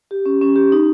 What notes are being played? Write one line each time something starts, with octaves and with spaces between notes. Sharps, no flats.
G4
C#4
C#4
G4
D#4